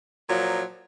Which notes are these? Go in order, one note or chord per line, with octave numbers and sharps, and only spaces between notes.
A#2 F3 F#3